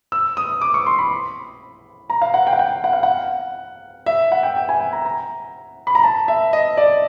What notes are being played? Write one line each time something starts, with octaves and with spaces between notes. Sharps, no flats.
E6
D#6
D6
C#6
C6
B5
A#5
F5
F#5
G5
F#5
G5
F#5
F5
F#5
E5
F#5
G5
G5
G#5
G#5
A#5
A#5
B5
A#5
A5
E5
D#5
D5